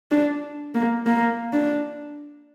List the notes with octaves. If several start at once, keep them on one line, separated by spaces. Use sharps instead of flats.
D4
A#3
A#3
D4